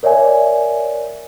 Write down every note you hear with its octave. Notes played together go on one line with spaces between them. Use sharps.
A#4 C#5 D5 E5 G#5